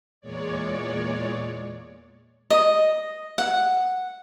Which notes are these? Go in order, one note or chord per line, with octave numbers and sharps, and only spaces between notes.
E2 A#2 G#3 C#5 D5
D#5
F#5